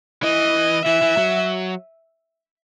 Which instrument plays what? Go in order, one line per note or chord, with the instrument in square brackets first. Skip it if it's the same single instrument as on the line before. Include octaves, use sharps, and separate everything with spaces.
[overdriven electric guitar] E3 [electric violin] D#5
[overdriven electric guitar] E3 [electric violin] E5
[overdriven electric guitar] E3
F#3